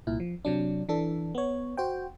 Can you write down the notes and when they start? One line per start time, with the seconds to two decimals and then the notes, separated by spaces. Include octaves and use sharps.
0.07 C2 A#2 E4
0.20 F3
0.45 C3 F#3 D4
0.89 E3 D4 A4
1.35 B3 C#5
1.77 F#4 C5 G5